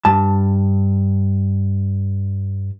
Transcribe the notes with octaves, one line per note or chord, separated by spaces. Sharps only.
G2 A5